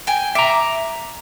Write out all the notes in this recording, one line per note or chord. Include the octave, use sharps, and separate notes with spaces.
G5 G#5
E5 A#5 D6